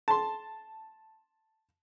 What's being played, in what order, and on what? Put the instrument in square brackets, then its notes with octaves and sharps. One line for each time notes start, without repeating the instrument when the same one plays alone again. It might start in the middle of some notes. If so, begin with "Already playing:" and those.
[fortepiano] A5 C6